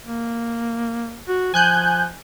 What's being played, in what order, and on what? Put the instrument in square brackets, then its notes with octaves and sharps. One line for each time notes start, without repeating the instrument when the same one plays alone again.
[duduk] A#3
F#4
[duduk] F3 [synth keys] G#5 F#6 G6